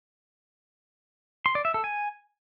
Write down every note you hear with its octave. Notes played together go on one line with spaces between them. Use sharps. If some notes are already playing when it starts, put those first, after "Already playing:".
C6
D5
E5
A4
G#5